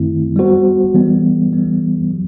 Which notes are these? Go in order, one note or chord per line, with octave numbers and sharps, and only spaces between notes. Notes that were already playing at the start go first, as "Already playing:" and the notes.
Already playing: F#2 D#3 A3 C4 E4
G3 B3 F#4 C5
E3 G3 B3
E3 G3 B3
F#3